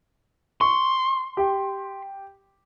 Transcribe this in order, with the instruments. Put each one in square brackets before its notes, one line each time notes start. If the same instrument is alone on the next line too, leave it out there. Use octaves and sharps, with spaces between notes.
[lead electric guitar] C6 [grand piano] C#6
[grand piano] G4